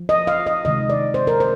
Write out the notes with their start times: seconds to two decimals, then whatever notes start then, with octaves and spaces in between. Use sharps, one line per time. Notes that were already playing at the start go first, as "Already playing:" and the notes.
Already playing: F3
0.09 D#5
0.27 F5
0.47 D#5
0.65 C3 D#3 G#3 D#5
0.90 D5
1.14 C5
1.27 A#4
1.40 C5